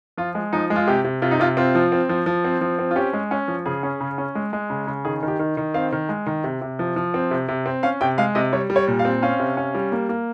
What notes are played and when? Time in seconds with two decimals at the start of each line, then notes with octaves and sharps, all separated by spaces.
0.18 F3 F4
0.35 G#3
0.53 F3 D#4
0.70 G#3
0.76 F4
0.87 C3 G4
1.04 C3
1.22 C3 F4
1.31 D#4
1.40 C3 F4
1.57 C4 F4
1.75 F3
1.92 C4
2.09 F3
2.26 F3
2.45 C4
2.61 F3
2.79 C4
2.91 F4
2.96 C#4 G4
3.13 G#3
3.31 C#4
3.48 F3
3.66 C#3 G#4
3.83 C#4
4.01 C#3
4.18 C#4
4.35 G#3
4.53 G#3
4.70 C#3
4.87 C#3
5.05 D#3 G#4
5.23 D#3
5.28 G4
5.39 D#3
5.57 D#3
5.74 C4 F5
5.92 D#3
6.09 G#3
6.26 D#3
6.44 C3
6.61 C3
6.79 F3
6.96 F3
7.14 C4
7.31 C3
7.48 C3
7.66 C4
7.83 C#4 F5
8.01 C3 G5
8.18 G#3 F5
8.35 C3 D#5
8.53 G3 C#5
8.70 G3
8.76 C#5
8.88 A#2
8.99 F5
9.05 C4
9.23 C#4 F5
9.40 C3
9.57 C#4
9.75 G3
9.92 A#3
10.09 A#3